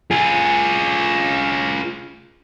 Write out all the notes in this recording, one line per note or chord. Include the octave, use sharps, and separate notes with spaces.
F4 G#4